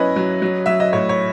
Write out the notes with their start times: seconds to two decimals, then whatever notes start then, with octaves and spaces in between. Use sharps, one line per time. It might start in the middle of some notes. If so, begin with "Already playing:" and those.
Already playing: F#3 C#4 E4 B4 D#5
0.16 F#3
0.42 F#3
0.66 F#3 E5
0.80 D#5
0.93 A2 C#5
1.09 C#5